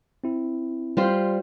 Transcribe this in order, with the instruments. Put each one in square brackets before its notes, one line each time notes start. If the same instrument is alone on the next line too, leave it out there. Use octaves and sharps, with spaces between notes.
[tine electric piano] C4 E4
[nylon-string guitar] G3 F4 C5